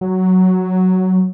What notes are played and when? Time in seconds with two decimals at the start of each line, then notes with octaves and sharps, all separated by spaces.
0.01 F#3